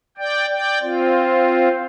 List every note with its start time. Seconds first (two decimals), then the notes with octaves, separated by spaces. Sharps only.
0.18 D5 G5
0.50 D5 G5
0.81 C4 F4